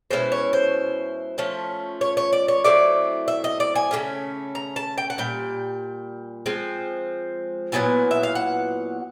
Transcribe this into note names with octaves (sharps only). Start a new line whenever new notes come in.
B2 G#3 C#4 E4 C5
C#5
C5
F3 A3 C#4
C#5
C#5
D5
C#5
F#3 A3 C4 E4 D5
E5
D#5
D5
G#5
C#3 F#3 A3 C#4
A#5
A5
G5
F#5
A#2 G3 G5
F3 G#3 C4
A#2 F#3 B3 E4 G#5
E5
F5
F#5